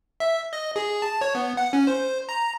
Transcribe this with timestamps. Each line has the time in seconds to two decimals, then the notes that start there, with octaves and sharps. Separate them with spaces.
0.20 E5
0.53 D#5
0.76 G#4
1.02 A5
1.21 C#5
1.35 B3
1.57 F#5
1.73 C#4
1.87 C5
2.29 A#5